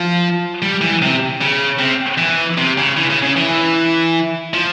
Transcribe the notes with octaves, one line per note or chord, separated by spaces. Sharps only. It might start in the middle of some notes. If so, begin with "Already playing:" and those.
Already playing: F3
G3
E3
C3
C#3
C3
E3
C3
C#3
E3
C#3
C#3
E3
F3